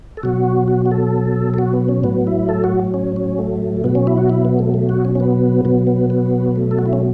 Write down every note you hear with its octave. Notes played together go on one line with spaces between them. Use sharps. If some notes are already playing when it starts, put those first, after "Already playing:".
A4
B2 F#3 F#4
F#4
F#4
A4
A4
F#4
B3
C#4
A2 F#3 B3
E4
A4
F#4
C#4
C#4
A3
B2 F#3 B3
C#4
E4
F#4
E4
B3
A3
A3
F#4
C#4
C#4
B3
B2 F#3 B3
B3
B3
A3
A4
F#4
E4
C#4